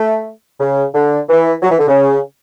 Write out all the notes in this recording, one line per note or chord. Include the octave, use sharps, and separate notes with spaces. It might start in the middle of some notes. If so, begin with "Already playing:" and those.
Already playing: A3
C#3
D3
E3
F#3
E3
D3
C#3